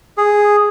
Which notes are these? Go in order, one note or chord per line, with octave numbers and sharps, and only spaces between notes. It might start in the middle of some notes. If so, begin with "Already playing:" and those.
G#4